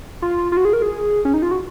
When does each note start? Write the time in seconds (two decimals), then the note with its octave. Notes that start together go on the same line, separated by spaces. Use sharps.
0.22 F4
0.52 F4
0.57 F#4
0.65 G#4
0.73 A#4
0.82 G#4
1.25 C#4
1.34 D#4
1.42 F4
1.51 F#4